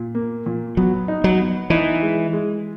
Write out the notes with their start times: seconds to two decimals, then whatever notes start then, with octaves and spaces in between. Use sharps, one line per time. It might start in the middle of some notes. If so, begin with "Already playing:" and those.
Already playing: A#2
0.15 A#3
0.46 A#2
0.77 F#3 B3
1.08 D#4
1.24 F#3
1.40 B3
1.70 E3 D#4
2.02 G#3
2.33 G#3